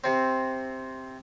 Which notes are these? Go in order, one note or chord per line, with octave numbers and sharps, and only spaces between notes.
C3 C4